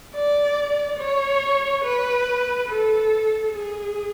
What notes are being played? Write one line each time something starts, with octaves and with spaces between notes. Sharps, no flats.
D5
C#5
B4
A4
G#4